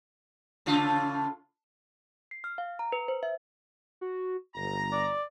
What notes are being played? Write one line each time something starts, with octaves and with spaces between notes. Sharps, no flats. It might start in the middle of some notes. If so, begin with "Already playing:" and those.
A2 C#3 F4
C7
F6
F5
A#5
B4
C5
E5
F#4
G1 A#5 A#6
D5